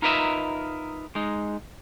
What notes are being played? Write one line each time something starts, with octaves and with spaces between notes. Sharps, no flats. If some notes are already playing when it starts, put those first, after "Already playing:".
D#4 F4 A#4 B4 D#5 E5
G#3 D#4